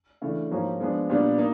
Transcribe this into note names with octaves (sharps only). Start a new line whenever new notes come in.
C#3 E3 A3 D4
G#2 F3 A#3 C#4 F#4
F3 G#3 B3 D4
A#2 G3 B3 D4
A#3 D#4